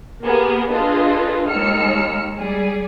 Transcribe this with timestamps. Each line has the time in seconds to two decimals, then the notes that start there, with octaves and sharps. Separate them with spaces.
0.24 A#3 B3 G4 G#4 A#4
0.70 D4 F4 G#4 A4 B4 D#5
1.48 D#2 G#3 E6 F6 C#7
2.37 G3 G#4 D5